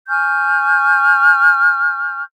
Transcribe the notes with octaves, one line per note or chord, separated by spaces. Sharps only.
G#5 C#6 F6 G6